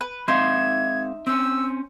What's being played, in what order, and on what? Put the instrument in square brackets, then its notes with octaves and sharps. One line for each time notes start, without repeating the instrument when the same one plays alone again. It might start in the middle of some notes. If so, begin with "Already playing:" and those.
[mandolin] B4
[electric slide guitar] G#3 C4 F5 [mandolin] D#4 E5 C6 [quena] G#6
[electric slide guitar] C4 C#4 [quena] E6